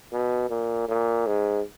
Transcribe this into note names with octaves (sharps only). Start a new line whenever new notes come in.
B2
A#2
A#2
G#2